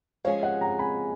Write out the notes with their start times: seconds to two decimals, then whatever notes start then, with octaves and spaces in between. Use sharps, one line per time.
0.24 F3 G#3 C#4 G#4 C#5 F5
0.43 D#5 F#5
0.61 F#5 A#5
0.79 G#5 B5